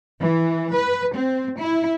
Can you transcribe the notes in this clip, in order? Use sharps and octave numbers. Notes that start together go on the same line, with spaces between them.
E3
B4
C4
E4